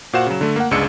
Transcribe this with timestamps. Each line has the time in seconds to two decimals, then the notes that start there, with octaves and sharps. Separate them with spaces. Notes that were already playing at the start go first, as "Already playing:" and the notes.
0.13 A#2 F#4 C5 F5 F#5 E7
0.26 C#3 F#3
0.41 D3 A3
0.56 A#3 F#5
0.71 G1 C#2 G#3 D4 E6 C#7